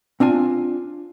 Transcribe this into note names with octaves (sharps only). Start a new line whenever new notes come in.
C4 D4 F4 G#5